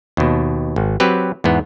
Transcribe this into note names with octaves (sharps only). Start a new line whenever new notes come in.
D#2 B2
G#1
F#3 C4 G4 B4
E2 G#2 B3